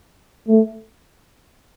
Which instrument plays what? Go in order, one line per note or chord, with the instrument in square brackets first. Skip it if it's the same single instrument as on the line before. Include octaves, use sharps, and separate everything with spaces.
[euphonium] A3